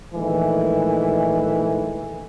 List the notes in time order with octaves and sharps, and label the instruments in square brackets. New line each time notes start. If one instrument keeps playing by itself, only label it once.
[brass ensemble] A#1 D#3 E3 G#3 A3